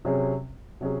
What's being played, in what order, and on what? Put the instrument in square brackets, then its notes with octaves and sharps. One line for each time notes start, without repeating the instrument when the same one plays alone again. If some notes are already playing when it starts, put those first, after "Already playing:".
[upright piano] C3 F#3 C#4 G#4
C3 F#3 C#4 G#4